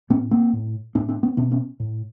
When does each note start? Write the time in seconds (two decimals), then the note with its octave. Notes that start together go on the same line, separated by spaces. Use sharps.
0.10 A2 B3 C#4
0.31 A#3 C4
0.53 A2
0.95 A2 C4 D4
1.09 C4 D4
1.23 B3 C#4
1.37 B2 B3 C#4
1.51 B3 C#4
1.80 A2